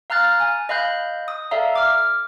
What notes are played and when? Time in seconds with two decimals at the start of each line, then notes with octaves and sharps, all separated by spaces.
0.10 F5 A#5 F6 F#6 A6
0.40 G#5
0.69 D#5 F5 B5 F#6 G6
1.28 D#6
1.51 A4 D5 E5 F5 A#5
1.76 D6 F6